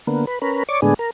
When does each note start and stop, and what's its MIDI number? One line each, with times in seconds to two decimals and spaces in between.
0.07 0.26 50
0.07 0.26 58
0.07 0.26 59
0.27 0.39 71
0.42 0.63 61
0.42 0.63 70
0.42 0.63 71
0.69 0.81 73
0.69 0.81 74
0.69 0.81 86
0.82 0.94 45
0.82 0.94 50
0.82 0.94 56
0.82 0.94 59
0.82 0.94 62
0.82 0.94 68
0.99 1.11 70